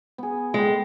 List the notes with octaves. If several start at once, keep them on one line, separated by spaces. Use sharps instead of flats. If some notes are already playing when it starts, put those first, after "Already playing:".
B3 G#4
G#3 D#5 G5